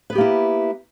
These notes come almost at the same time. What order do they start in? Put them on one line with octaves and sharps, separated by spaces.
B4 B3 G4 A#3 E4